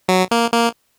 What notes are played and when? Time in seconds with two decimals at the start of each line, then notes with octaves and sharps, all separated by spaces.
0.08 F#3
0.31 A#3
0.53 A#3